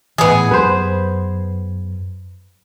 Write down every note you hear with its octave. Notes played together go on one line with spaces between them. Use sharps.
A2 E3 B3 G#4
F#2 B4 C5